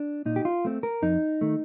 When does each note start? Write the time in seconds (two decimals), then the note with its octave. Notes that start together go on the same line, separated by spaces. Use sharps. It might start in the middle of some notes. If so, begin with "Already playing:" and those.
Already playing: D4
0.26 A#2 D#4
0.36 G4
0.45 F4
0.65 A3 C4
0.83 A#4
1.02 F2 D#4
1.41 D#3 A3